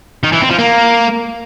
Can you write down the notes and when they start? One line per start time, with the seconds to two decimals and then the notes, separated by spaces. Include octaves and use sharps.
0.24 D#3
0.32 E3
0.41 C4
0.50 F3
0.59 A#3